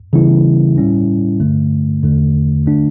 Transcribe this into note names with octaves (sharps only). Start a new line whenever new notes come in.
C#3 E3 G3 B3 E4
A2 G3 C#4 E4
G2 D3 A3
E2 D3 A3
D3 A3 D4